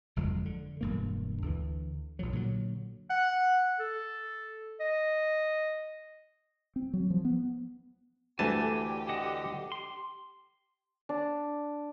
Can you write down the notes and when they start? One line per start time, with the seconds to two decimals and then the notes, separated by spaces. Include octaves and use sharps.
0.16 F#1 F2 F3 G#3
0.45 D3
0.81 E1 G2 A#3
1.42 D2 D3 E3
2.19 A#1 F3 F#3
2.33 A#2 D3 D#3 F#3
3.10 F#5
3.79 A4
4.80 D#5
6.76 C4
6.93 F#3
7.10 F3
7.25 B3
8.39 D2 E3 A3 D4 G4 G#5 A5
9.09 D3 D#5 F#5
9.72 C6
11.09 D4